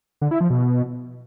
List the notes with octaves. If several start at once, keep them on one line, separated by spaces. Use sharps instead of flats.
D3
E4
F3
B2